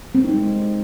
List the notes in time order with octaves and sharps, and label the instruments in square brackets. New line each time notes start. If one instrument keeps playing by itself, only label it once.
[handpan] C4
D#4
G#3